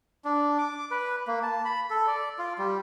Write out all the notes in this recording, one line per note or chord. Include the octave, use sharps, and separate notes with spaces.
D4
D6
B4
A#3
A5
B5
A4
D5
F4
G3